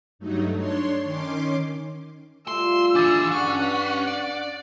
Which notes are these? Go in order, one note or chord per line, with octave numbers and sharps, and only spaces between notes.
G2 F#3 A3 D#4
D4 C#5 C6
D#3 C#4 C6 D6
G3 A3 F4 C6 E6
E3 D4 G#4 D6 A6
G2 C#4 F#5
D5